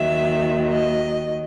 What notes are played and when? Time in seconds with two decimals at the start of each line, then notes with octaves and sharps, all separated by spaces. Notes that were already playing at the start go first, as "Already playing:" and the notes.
Already playing: D#2 D#3 F#3 E5
0.72 D#5